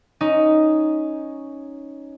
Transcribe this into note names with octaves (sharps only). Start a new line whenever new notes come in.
C#4 D#4